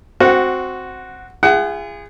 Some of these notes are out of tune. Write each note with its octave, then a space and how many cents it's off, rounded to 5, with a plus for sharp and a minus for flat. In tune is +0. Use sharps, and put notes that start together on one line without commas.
C4 +0 F#4 +0 F#5 -20
F4 -45 G#4 -25 F#5 +25